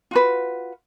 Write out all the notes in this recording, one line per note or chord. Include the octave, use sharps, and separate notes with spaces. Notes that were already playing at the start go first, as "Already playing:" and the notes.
F4 F#4 B4